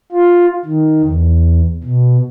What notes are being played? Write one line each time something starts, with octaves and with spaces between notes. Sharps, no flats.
F4
D#3
E2
B2